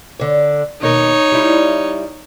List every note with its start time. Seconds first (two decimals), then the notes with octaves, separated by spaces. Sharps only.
0.20 D3 C#5
0.81 D#2 B2 D#4 A#4 C#5
1.32 G3 E4